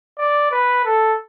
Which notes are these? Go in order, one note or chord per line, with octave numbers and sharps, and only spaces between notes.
D5
B4
A4